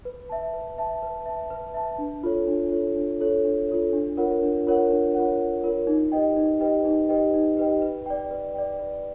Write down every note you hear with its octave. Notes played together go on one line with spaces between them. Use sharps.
B4
E5 A5
B4
E5 A5
B4
E5 A5
B4
E5 A5
D4
F4 A4 C#5
D4
F4 A4 C#5
D4
F4 A4 C#5
D4
F4 A4 C#5
D4
F4 A#4 C#5 F#5
D4
F4 A#4 C#5 F#5
D4
F4 A#4 C#5 F#5
D4
F4 A#4 C#5 F#5
D#4
G4 B4 D#5 G5
D#4
G4 B4 D#5 G5
D#4
G4 B4 D#5 G5
D#4
G4 B4 D#5 G5
B4
D5 G5
B4
D5 G5
B4